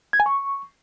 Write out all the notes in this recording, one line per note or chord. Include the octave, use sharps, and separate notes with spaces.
G#6
G#5
C#6